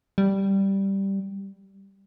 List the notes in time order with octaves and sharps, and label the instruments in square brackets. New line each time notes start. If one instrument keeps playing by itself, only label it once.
[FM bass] G3